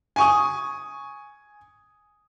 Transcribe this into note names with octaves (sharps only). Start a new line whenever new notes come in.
G#5 C#6 D#6